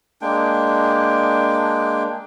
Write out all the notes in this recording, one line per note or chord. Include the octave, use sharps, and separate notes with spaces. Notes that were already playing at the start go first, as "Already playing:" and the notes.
G#3 A#3 D4 G5